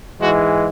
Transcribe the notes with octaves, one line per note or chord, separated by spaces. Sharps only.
G#2 E3 G#3 F#4